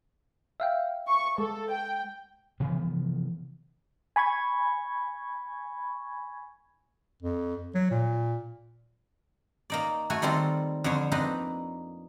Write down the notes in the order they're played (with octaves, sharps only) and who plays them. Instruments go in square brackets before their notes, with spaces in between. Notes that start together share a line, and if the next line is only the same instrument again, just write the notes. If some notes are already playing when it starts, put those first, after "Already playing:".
[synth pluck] E5 F5 G5
[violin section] C#6
[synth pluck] G#3 [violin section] A4
[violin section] G5
[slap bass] C3 E3 F3 B3
[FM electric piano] G#5 B5 C#6 G#6
[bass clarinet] F2
F#3
A#2
[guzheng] A#3 D#4 D5
A3 F#4 G#5
D#3 G3 C4 F4 A4
F2 D3 C5 C#5
A#3 C4 D4 D#4 B4